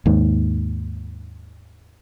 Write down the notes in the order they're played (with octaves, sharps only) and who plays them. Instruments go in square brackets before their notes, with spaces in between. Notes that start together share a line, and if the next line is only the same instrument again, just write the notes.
[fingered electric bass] D#2 G#2